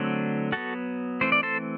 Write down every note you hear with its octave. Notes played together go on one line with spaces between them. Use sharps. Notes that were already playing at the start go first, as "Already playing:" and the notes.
Already playing: D3 F#3 A3 C4
F#3 B3 F#4 A4
E3 A3 C4 C5
D5
A4 C5